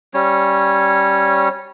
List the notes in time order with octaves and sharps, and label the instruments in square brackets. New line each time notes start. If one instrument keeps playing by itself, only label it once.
[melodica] G3 C#4 C#5